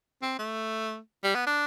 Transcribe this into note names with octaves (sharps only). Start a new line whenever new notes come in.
C4
A3
G3
B3
D4